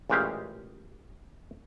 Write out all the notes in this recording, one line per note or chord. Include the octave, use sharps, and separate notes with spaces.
A1 A#2 C#3 G#3 G4 F5